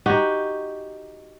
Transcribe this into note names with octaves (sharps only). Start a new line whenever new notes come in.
D#4 F#4 G4